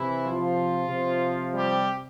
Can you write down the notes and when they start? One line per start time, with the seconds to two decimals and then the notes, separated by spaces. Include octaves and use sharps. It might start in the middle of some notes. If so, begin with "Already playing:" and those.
Already playing: C3 E3 E4
0.26 F3 F4
0.90 C3 F3
1.55 G3 G4